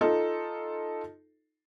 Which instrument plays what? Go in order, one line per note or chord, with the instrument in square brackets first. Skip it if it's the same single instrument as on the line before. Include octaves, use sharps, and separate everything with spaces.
[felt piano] D#4 F4 A4